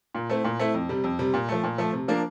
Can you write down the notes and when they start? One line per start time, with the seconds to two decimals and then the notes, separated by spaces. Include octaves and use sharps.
0.15 A#2
0.29 A3 C4 E4
0.44 A#2
0.59 A3 C4 E4
0.74 F2
0.89 C3 G3
1.04 F2
1.19 C3 G3
1.34 A#2
1.48 F3 A3
1.64 A#2
1.78 F3 A3
1.93 C3
2.08 F3 A#3 D4